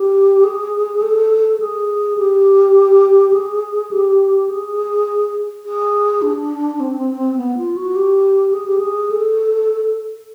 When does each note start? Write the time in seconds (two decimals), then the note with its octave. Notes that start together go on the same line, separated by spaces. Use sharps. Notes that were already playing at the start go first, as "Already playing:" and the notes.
Already playing: G4
0.44 G#4
1.03 A4
1.60 G#4
2.18 G4
3.33 G#4
3.91 G4
4.49 G#4
5.65 G#4
6.22 D4
6.80 C4
7.38 B3
7.57 F4
7.76 F#4
7.95 G4
8.53 G#4
8.66 G4
8.79 G#4
9.11 A4